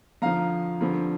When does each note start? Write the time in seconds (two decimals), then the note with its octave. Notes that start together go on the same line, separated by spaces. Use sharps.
0.22 F2 D3 F3 F5 A#5
0.81 G2 D3 F3 C4